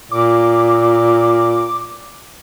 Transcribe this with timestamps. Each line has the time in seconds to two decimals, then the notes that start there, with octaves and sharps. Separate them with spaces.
0.11 A#2 D6